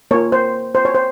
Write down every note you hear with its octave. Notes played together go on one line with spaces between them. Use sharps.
A#3 F4 C#5
C5
C5
C#5
C5